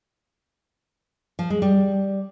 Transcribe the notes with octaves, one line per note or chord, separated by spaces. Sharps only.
F3
G#3
G3